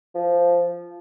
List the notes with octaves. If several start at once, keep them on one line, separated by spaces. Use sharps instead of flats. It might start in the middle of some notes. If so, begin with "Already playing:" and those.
F3